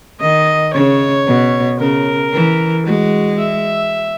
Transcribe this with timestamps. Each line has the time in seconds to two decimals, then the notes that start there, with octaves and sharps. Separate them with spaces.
0.20 D#3 D#5
0.73 C#3 C#5
1.26 B2
1.80 C#3 A#4
2.33 E3
2.86 G#3 F#4
3.38 E5